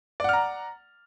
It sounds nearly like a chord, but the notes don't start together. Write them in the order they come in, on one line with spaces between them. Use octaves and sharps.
D5 F#5 F6 A#5